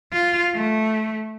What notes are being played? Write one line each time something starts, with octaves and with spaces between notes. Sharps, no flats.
F4
A3